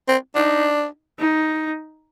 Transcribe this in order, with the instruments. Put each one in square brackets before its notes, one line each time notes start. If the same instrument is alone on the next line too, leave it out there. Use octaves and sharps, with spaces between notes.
[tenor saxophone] C4
[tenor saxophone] D4 [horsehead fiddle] D#4
[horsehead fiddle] D#4